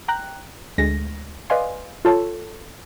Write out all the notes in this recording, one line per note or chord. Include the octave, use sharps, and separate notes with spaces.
G5 A#5 F#6
D2 G#3 A#6
B4 D5 D#5 F5 G#5 C6
F4 A4 C#5 A5